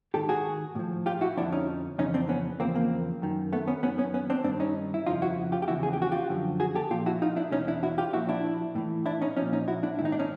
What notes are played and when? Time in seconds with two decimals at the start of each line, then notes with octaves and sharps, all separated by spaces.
0.14 G#2 D#3 G4 A4
0.29 F#4 G#4
0.75 A2 F3
1.06 F4 G4
1.21 E4 F#4
1.37 F2 D3 F3 D4 E4
1.52 C#4 D#4
1.98 F2 C#3 E3 C#4 D#4
2.14 C4 D4
2.29 B3 C#4
2.60 E2 C#3 F3 A#3 C4
2.75 A#3 C4
3.22 F#2 D#3
3.53 A3 B3
3.68 B3 C#4
3.83 F#2 D#3 B3 C#4
3.98 B3 C#4
4.14 B3 C#4
4.30 C4 D4
4.44 G2 C4 D4
4.49 D#3
4.60 C#4 D#4
4.94 E4
5.06 F2 C#3 F3 D#4 F4
5.22 E4 F#4
5.52 F4 G4
5.62 G4
5.68 E2 C#3 F3 E4 F#4
5.83 G#4
5.93 G4
6.02 F#4
6.12 F4 G4
6.29 F#2 D3 F3
6.60 F#4 G#4
6.75 G4 A4
6.90 A#2 F3 F4 G4
7.06 E4 F#4
7.22 D#4 F4
7.36 D4 E4
7.52 E2 B2 C#4 D#4
7.68 D4 E4
7.83 E4 F#4
7.98 F4 G4
8.13 A#2 F3 E4 F#4
8.29 D4 E4
8.75 A2 E3
9.06 D4 E4
9.22 C#4 D#4
9.37 F3 C#4 D#4
9.41 A#2
9.53 C#4 D#4
9.68 E4 F#4
9.83 D4 E4
9.99 G#2 E4
10.01 D#3 D#4
10.12 D4
10.19 C#4 D#4